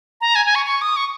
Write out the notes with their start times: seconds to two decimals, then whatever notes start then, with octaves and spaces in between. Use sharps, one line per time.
0.21 A#5
0.35 G#5
0.46 G#5
0.55 C#6
0.66 C#6
0.82 D#6
0.97 C#6